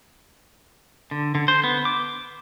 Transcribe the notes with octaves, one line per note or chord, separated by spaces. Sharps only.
D3
D3
C5
B3
D6